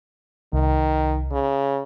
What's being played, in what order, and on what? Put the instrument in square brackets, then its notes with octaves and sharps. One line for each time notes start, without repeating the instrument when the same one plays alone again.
[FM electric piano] C2 [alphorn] D#3
[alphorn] C#3